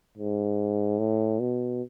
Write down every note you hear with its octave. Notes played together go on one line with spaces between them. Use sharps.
G#2
A2
B2